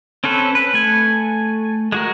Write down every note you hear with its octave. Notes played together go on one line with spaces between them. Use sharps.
C4 C#4 A4 B4
B4
A3 G#5
G#3 F#4 A#4